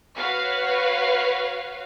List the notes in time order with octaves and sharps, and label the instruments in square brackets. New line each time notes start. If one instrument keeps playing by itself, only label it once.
[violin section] F#4 B4 C#5 F5